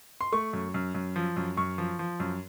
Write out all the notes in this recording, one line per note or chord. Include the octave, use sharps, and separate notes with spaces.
C6
A3 C#6
F#2
F#2
F#2
F3
F#2
F#2 C#6
F3
F3
F#2